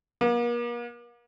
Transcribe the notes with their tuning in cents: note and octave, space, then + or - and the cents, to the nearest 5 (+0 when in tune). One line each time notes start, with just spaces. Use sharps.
A#3 +40